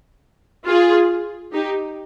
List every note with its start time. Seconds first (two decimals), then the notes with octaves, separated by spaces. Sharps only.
0.65 F4 G#4
1.53 D#4 G4